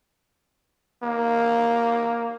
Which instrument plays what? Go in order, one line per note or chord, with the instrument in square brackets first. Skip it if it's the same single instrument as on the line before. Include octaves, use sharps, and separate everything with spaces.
[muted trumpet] A#3